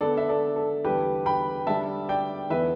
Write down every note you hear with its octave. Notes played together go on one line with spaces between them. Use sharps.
D3 B3 D4 A4 D5
E5
A4 D5
A4
E2 D3 G3 G4 B4
G5 B5
D3 G3 D4 E5 A5
D5 G5
E2 D3 B3 B4 E5